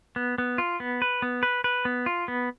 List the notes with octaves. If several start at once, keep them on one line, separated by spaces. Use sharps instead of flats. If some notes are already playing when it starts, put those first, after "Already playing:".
B3
B3
F4
B3
B4
B3
B4
B4
B3
F4
B3